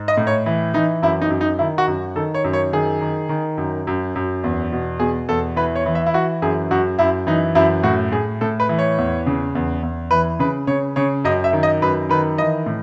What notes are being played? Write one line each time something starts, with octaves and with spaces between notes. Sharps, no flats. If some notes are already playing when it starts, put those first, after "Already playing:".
Already playing: G#2
D#5
A2
C#5
E3
E3 D#4
F#2 E4
D#4
F#2
D#4
D#3 E4
F#4
F#2
D#3 A4
C#5
F#2
C#5
D#3 G#4
D#3
D#3
F#2
F#2
F#2
E2
B2
B2 G#4
E2 A4
E3 B4
C#5
E3
E5
E4
E3 F#4
F#2 G#4
F#2 F#4
F#2 E4
E3 D#4
F#2 E4
A2 F#4
A2 G#4
A2 A4
B4
E3
C#5
E2
C#3
E2
E2
E3 B4
C#3 B4
C#3 C#5
C#3 C#5
F#2 D#5
E5
D#3
D#5
F#2 B4
D#3 B4
E3 D#5
A2